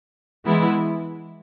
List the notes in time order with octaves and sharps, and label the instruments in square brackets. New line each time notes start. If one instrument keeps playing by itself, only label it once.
[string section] E3 G#3 B3 E4